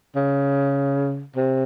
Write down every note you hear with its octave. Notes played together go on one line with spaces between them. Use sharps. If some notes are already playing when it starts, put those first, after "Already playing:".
C#3
C3